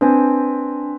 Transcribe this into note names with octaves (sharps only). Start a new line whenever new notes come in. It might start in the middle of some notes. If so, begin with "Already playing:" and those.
C4 D4 B4 G#5